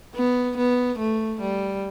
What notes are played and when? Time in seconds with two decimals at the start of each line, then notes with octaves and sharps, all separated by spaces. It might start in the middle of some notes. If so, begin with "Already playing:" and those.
0.15 B3
0.57 B3
0.99 A3
1.41 G3